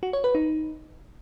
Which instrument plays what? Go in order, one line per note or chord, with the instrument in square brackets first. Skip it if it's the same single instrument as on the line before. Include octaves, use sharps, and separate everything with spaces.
[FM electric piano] F#4
C#5
B4
D#4